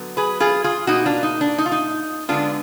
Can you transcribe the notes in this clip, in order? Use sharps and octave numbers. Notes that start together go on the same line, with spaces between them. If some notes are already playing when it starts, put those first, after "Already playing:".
Already playing: D3 F#3 B3
G#4 B4
F4 G#4
F4 G#4
B2 A#3 D#4 F#4
D4 F4
D#4
D4
D#4
F4
D#4
D3 G#3 B3 D4 F4